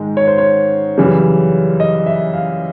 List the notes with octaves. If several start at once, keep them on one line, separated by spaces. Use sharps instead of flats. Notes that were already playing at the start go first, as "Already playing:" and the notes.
Already playing: G#2 D#3 G#3
C#5
C5
C#5
F#2 C#3 E3 G3
D#5
E5
F5